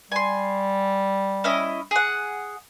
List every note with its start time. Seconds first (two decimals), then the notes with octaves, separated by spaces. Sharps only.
0.12 G3 G#5 C6
1.44 C#4 E4 D#5
1.91 G#4 F#5